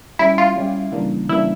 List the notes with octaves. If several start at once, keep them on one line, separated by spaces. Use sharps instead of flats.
G3 C#4 E4 G4
F4
G3 C#4 G4
C#3 E3 G3 A#3 D4
C#3 E3 G3 A#3 D4 E4